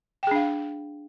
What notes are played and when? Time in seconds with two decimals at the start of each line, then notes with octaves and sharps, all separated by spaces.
0.23 G5
0.27 G#4
0.31 D4
0.36 F5